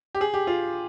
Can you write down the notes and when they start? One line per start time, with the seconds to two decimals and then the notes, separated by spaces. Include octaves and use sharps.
0.15 G4
0.21 G#4
0.34 G4
0.47 F4